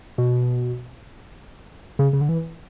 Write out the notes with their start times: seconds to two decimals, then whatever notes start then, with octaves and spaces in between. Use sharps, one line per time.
0.18 B2
1.99 C#3
2.13 C#3
2.21 D3
2.29 E3